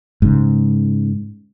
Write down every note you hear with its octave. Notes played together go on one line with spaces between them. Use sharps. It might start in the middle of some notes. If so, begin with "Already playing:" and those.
G#2 C#3